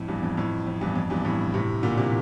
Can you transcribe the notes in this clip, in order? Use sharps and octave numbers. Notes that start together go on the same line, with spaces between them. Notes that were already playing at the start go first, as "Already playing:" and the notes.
Already playing: F2 A2
E2 G2
F2
F2 A2
F2
E2 G2
F2
E2 G2
F2 A2
A2 C3
A#2 D3
C3 E3